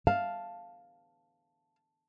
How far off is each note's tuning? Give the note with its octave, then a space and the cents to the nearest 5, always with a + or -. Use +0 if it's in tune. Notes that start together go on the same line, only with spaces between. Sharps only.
F5 +0 A5 +0